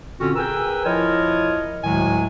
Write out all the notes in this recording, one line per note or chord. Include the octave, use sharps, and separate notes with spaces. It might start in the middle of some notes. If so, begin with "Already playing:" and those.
A#2 D3 C4 C#4 F4 F#4
G#4 A#4 B4 G5 G#5 E6
F3 E4 F4 A#4 C#5 D#5
D2 A2 D#3 F#3 G#3 G#5